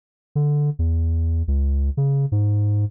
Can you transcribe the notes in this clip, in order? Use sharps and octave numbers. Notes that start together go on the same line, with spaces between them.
D3
E2
C#2
C#3
G#2